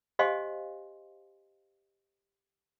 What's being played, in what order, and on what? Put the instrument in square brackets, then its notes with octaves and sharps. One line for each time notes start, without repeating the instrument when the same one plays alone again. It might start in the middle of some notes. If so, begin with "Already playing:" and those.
[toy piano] G4 C5 D#5 F5 G#5 C6